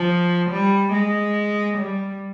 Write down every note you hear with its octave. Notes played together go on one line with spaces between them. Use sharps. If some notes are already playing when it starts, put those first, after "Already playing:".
Already playing: F3
G3
G#3
G3